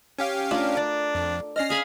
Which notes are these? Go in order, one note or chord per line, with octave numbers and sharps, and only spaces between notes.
C#4 G4 F5
A3 D4 F4 A#4
D4 D5
F2
C#4 D5 D#5 F6 A#6 C7
G#4 F5 B5